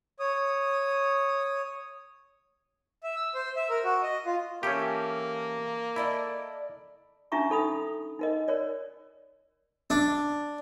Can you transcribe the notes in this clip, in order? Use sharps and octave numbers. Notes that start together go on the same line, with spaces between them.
C#5 D#6
E5
E6
C5
E5
A#4
F#4
D#5
F4
E3 A#3 C#4 G4 A4
E4 A4 D5 D#5
C#4 D4 E4 E5 A#5 C#6
D#4 A4 B5 D#6
D#4 A#4 D#5
A#4 C#5 D5
D4